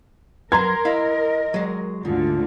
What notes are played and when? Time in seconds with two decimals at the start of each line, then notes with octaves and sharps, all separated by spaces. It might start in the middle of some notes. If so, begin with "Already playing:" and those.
0.52 F#3 A#4 B4 A#5 C6 G#6
0.85 E4 D#5 F5
1.54 F#3 G#3
2.05 D2 G#2 D3 F4